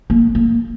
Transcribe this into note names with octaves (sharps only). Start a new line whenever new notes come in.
A#3
A#3